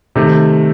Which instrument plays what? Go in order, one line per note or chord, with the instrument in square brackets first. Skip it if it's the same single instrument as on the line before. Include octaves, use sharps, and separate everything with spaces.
[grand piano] C3 D#3 A3